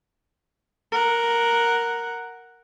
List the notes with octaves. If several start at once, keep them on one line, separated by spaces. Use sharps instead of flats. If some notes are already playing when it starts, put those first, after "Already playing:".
A#4 F#5